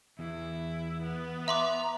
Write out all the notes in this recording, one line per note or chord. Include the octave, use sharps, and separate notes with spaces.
E2 E4
B3
E5 A#5 C6 D6